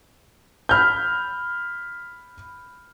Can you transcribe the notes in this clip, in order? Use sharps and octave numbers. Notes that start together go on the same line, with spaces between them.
B5 F6 G6